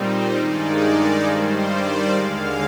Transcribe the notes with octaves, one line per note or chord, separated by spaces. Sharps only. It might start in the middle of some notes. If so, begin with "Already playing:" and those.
Already playing: A#2 G3 C4 D#4 C5
G2 D#3 G#3 D#4 D5
D5
G2 D#3 G3 C5
D5
D#2 D3 G#3 F5